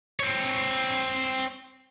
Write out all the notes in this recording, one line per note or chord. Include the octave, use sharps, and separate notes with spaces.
C4 C#5